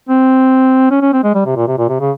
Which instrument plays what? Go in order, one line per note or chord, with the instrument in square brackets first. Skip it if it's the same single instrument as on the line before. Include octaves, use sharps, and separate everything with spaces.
[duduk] C4
C#4
C#4
C4
G#3
G3
C3
A#2
C3
A#2
C3
C#3